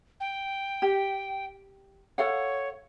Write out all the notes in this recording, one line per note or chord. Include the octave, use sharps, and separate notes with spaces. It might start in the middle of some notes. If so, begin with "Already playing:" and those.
G5
G4
A4 C#5 F5 F#5